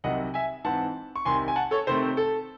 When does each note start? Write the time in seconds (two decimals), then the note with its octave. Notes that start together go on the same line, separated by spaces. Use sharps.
0.04 C2 C3 D#3 F#3 D#5 F#5
0.34 E5 G#5
0.64 G#2 E3 C4 F#5 A5
1.16 C#6
1.25 C2 C3 D#3 G#5 C6
1.48 G#5
1.56 F#5 A5
1.71 A4 C#5
1.87 C3 D#3 A3 C4 C5
2.17 A4